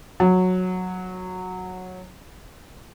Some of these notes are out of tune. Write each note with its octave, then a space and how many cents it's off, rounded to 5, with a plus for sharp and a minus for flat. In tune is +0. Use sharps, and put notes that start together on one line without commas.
F#3 -10